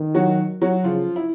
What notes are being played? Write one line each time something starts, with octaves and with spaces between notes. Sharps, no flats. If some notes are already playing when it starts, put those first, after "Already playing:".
Already playing: D#3
F#3 F#4
F#3 F#4
C#3 F3 F4
E4